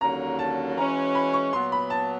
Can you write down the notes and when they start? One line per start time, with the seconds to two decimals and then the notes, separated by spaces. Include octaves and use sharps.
0.01 D#2 D3 F#3 A#3 C#4 A#5
0.39 A5
0.77 E3 G#3 C#4 F#4 A#5
1.15 B5
1.33 C#6
1.53 A#2 F#3 B3 C6
1.72 B5
1.90 A5